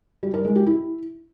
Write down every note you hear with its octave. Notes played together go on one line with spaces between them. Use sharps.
G3
A#4
G#3
G4
E4